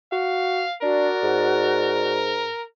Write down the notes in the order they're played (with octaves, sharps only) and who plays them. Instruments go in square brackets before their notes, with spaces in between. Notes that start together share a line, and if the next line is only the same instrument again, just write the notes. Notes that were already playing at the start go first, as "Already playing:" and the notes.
[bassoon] F#4 [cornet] F5
[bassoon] D4 [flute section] F#4 D5 [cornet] A#4
[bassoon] G#2